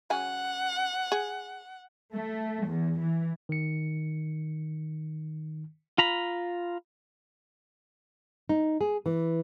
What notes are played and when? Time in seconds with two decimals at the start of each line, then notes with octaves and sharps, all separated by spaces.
0.10 C#3 F#3 F#5 G#5
1.12 G#4
2.14 A3
2.64 E2
2.99 E3
3.49 D#3 C#7
5.98 F4 A#5 B5
8.49 D#4
8.81 G#4
9.06 E3